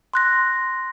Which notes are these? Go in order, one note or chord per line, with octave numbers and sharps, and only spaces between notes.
C6 F#6 A#6